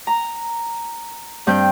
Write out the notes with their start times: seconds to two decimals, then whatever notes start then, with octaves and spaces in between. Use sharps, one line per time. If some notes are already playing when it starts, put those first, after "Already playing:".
0.07 A#5
1.47 G2 C4 G6